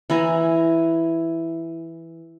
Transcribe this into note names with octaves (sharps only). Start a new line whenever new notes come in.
E3 E4 G#5 A#5